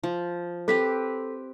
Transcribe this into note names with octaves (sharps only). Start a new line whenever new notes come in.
F3
C4 G4 A4 B4 B6